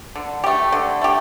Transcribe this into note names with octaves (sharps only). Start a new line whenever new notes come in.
D3
A3 G4
D3
A3 G4